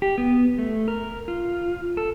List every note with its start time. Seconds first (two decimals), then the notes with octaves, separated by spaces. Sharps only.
0.02 G4
0.18 B3
0.59 A3
0.88 A#4
1.28 F4
1.97 A4